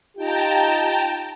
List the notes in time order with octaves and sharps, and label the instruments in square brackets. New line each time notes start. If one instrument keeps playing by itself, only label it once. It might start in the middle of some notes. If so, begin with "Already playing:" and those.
[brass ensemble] D#4 F4 G4 [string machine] G5 A5 A#5